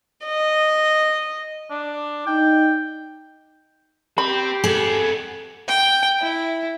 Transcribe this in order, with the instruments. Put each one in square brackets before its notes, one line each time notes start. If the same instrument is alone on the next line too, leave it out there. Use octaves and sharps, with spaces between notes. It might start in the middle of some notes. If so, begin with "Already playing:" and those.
[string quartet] D#5
[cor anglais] D4
[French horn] D#4 [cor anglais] G5
[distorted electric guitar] C4 [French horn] G4 [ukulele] B5
[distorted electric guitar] F2 B3 [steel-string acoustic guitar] G#4 A4
[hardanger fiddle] G5
E4